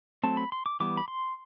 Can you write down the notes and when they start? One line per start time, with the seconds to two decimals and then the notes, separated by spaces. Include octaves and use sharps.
0.23 F#3 A3 C4 A5
0.37 B5
0.52 C6
0.66 D6
0.80 E3 G3 B3 D6
0.97 B5
1.08 C6